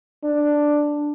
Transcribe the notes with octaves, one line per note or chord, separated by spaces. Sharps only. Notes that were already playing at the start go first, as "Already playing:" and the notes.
D4